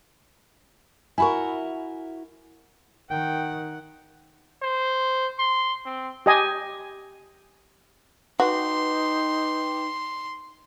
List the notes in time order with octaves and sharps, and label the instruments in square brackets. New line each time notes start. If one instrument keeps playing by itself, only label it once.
[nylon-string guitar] E4 F#4 A#4 [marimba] G#5 B5 C#6
[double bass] D#3 [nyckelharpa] F#5 [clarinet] G5
[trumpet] C5
C6
C4
[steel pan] G4 D#5 G#5
[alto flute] D#4 [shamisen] F#4 [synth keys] B4 G5 D6 [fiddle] C6